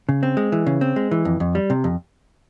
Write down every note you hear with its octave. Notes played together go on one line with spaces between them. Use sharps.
C#3
C4
G#3
E3
C#3
C4
G#3
E3
F2
F2
G3
C3
F2